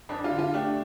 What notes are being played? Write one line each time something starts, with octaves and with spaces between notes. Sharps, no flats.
F2 D4
F4
D3
F4
A3 D4 G4